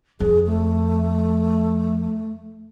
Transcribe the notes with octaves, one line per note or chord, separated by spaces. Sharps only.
F2 G#4
A3